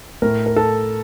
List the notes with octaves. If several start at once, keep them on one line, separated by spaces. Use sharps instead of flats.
A2 A3 A#4
A#4
A4